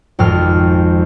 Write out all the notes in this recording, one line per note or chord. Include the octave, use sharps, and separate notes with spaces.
G#1 F2 F6